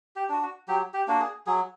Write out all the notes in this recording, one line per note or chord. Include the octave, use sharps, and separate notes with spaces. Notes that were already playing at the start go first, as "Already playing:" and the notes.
G4
D4 F#4
F#4
F#3 G4
G4
A#3 D4 F#4
G#4
F#3 G#4